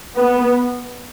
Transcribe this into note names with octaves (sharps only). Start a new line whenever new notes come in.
B3